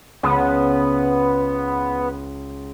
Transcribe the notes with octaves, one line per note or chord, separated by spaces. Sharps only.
C#2 B3